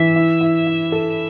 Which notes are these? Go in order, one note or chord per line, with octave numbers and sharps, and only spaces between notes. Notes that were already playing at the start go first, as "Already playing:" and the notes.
Already playing: E3 E5
E4
E4
E4
A4